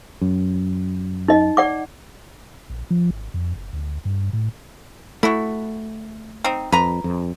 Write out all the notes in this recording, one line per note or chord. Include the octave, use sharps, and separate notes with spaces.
F#2
D#4 D#5
D5 F#5 D6
A#1
F3
G#1
F2
F#1
D2
G2
A2
A3 E4 F#4
C4 D#4
F2 B4 A#5
F2